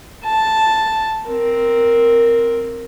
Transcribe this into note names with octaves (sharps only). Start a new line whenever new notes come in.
A5
C4 A#4